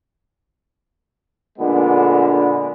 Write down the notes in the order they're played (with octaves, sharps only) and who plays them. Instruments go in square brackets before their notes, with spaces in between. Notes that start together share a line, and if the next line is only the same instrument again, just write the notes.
[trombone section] A#2 D3 G#3 B3